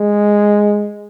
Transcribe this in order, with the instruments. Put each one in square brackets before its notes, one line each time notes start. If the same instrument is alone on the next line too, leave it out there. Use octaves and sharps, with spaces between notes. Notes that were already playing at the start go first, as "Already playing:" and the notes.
Already playing: [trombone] G#3